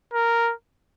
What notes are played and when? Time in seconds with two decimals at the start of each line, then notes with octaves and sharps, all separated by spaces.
0.14 A#4